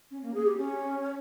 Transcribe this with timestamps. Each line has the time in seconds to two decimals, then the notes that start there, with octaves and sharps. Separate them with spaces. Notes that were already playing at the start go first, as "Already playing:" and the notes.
0.11 C#4
0.23 A#3
0.34 G#4
0.46 G4
0.58 C#4